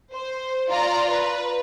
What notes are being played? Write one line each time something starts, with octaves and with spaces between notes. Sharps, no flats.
C5
F4 D5 A#5
B4